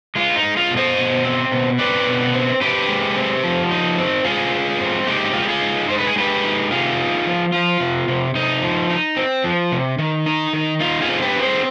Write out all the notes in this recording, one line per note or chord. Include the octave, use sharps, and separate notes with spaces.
G#3 F4
D#4
G#3
F4
B2
C5 D#5
B2
C4
B2
C4 B4 D5
B2
C4
C4 G4 B4
G#3
C4
F3
D#4
C4
G#3 F4 G#4
G#3
C4
G#3 D#4 G4
G#3 F4
G4
F4 G#4
D#4
G#3 C5
B4
G#4
G#3 G4 B4
D#4
C3 F4 G#4
D#4
F3
F3 F4
C3
C3
C3 D#4
F3
D#4
C4
F3
C3
D#3
D#4
D#3
D#4 F4
F4 G#4
C4
G4 B4
C4
G#4 C5